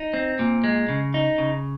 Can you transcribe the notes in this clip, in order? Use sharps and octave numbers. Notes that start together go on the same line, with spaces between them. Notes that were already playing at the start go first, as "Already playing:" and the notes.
Already playing: D#4
C4
A#2
G#3
C#3
D#4
C#3